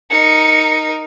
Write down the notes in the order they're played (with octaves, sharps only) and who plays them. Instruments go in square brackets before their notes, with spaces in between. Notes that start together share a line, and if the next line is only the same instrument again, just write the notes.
[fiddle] D#4 A#4 [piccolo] C#7